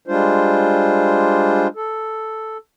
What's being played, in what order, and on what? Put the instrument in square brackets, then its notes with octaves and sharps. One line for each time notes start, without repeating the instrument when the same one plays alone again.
[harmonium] G3 G#3 D4 F4 C5
A4